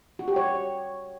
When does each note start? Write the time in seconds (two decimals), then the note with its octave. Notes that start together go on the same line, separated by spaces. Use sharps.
0.19 F#4
0.28 G4
0.36 C#5